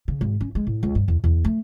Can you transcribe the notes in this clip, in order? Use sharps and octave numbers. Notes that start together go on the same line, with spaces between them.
C#3
G#1
C#4
G#3
A2
C#2
G2
E2
E2
A3